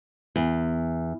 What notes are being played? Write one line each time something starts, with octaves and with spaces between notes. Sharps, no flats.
E2